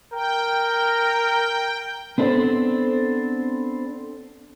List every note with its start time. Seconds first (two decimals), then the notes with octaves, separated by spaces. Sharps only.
0.13 A#4 G5
2.18 B3 C4 D4 A4 C5